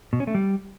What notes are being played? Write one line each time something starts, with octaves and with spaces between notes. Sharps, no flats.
B2
C#4
A3
G3